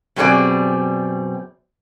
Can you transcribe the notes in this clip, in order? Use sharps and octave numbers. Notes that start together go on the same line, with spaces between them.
F#2 B2 G3 C4 G#4 D5